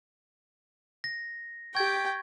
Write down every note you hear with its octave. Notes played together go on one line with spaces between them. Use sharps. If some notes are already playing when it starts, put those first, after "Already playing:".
A#6
G4 G5 C#6 G#6 A6